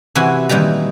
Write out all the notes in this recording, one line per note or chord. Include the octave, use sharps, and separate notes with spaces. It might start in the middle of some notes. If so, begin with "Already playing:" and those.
C3 E3 E4 F#4 G#5
A#2 D#3 E3 G3 A#5